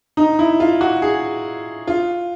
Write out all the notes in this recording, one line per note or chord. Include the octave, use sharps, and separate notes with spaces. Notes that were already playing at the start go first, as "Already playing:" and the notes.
D#4
E4
F4
F#4
G#4
F4